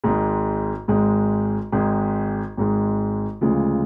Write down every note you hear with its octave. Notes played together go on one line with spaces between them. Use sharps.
G#1 G#2 G#3
G#1 G#2 G#3
G#1 G#2 G#3
G#1 G#2 G#3
D2 C#3 F3 G#3